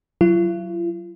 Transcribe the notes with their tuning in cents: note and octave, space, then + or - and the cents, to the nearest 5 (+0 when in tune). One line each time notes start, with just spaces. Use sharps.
F#3 +0 F4 -45